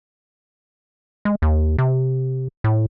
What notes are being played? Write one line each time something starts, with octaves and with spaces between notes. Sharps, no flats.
G#3
D#2
C3
A2